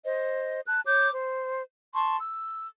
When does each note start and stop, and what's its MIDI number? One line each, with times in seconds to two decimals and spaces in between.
0.04 0.61 72
0.04 0.61 75
0.67 0.80 81
0.67 0.80 90
0.86 1.10 73
0.86 1.10 86
0.86 1.10 91
1.13 1.62 72
1.94 2.17 81
1.94 2.17 84
1.94 2.17 85
2.20 2.67 88